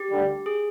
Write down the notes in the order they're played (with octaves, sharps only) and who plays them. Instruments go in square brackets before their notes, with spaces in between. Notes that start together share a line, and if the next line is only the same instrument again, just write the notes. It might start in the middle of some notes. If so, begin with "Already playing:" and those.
Already playing: [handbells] G4
[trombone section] D2 D3 G3
[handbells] G#4